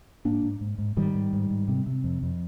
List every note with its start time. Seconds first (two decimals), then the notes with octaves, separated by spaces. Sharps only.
0.25 G#2 A#3 D4
0.43 G#2
0.61 G#2
0.78 G#2
0.97 G#2 D#3 G3
1.15 G#2
1.33 G#2
1.51 G#2
1.68 C3
1.86 C3
2.04 F2
2.23 F2